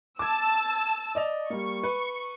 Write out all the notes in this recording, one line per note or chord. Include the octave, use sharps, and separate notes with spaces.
A5 D6 E6 G#6
D5 D#5 F7
G3 A#3 C#6
B4